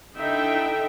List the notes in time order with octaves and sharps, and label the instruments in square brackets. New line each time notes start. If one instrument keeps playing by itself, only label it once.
[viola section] D3 D#4 E4 E5 G5